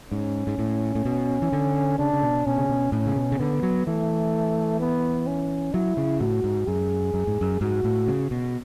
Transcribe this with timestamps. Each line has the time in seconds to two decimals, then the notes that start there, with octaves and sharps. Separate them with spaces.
0.12 G#2 C#4
0.47 G#2
0.59 A2
0.95 A2
1.05 B2
1.42 E3
1.52 D3
1.99 C#3 D4
2.13 C#3
2.23 B2
2.46 B2 C#4
2.58 C#3
2.69 B2
2.92 A2 C#4
3.06 C#3
3.16 B2
3.32 C#3
3.39 D3 B3
3.63 F#3
3.86 E3 A3
4.80 B3
5.27 C#4
5.74 F#3 E4
5.97 C#3
6.20 A2 F#4
6.44 G#2
6.67 F#2 G#4
7.14 F#2
7.27 G#2
7.41 F#2
7.61 G#2 F#4
7.84 A2
8.08 C#3
8.31 B2